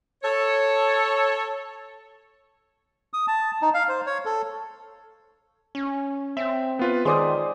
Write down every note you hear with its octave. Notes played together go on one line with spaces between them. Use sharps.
A4 C#5
D#6
A5
D#4
F5
C5
C#5
A4
C#4
C4 E5
B3 F4 B4
D#3 G#3 C5 D5 C6 D#6